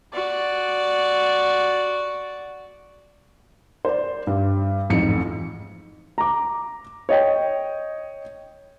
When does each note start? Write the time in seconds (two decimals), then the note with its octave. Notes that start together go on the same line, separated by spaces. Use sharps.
0.13 F#4 D5
3.85 C5 D5
4.27 G2
4.90 A1 F2 G#2 C#7
6.18 A#5 D6
7.09 C#5 D#5 G5